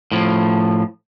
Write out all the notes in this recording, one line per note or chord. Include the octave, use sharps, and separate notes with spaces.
A2 F3